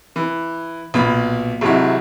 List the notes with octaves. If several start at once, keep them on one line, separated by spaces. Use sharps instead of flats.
E3
B1 A#2 B5
G#1 C3 F#3 E4